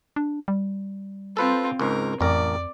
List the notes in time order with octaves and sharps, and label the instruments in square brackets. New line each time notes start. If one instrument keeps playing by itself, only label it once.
[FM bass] D4
G3
[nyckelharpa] C4 F4 [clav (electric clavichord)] A4 B4 C5
[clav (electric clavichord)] C#2 G#2 [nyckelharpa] A#4
[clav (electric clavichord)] A1 A#4 [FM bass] F2 [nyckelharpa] D5